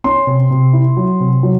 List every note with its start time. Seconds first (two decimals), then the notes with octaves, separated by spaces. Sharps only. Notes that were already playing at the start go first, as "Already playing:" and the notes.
0.04 C#4 C6
0.27 C3
0.51 C3
0.73 E4
0.97 F#3
1.20 C3
1.43 F#3